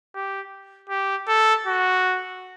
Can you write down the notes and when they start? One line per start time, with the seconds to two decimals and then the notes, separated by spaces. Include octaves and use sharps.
0.15 G4
0.89 G4
1.28 A4
1.66 F#4